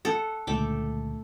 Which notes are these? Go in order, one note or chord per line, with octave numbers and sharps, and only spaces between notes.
A4 F#5
C#2 A#2 D3 A3 G5 D6